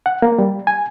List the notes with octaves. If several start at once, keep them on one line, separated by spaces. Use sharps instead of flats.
F#5
A#3
G3
G#5